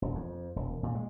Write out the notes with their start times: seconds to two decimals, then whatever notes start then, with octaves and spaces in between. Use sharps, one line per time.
0.02 E1
0.15 F2
0.56 E1
0.83 A#2
0.95 G#3